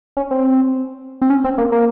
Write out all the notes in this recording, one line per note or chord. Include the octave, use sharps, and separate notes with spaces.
C#4
C4
C4
C#4
C4
A#3
A#3